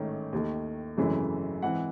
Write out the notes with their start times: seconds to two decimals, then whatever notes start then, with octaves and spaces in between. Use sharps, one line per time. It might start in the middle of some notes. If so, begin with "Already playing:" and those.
Already playing: A1 G#2 D#3 A3 C#4
0.33 D#2 D#3 A3
0.97 G#1 F#2 C#3 E3 A3
1.62 G#2 E3 C4 F#5